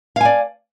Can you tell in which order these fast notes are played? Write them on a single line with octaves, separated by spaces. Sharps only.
F5 G#5 D5